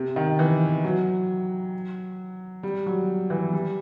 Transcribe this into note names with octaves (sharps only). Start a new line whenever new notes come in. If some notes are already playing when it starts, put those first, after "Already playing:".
Already playing: C3
D#3
E3
F#3
G3
F#3
E3
G3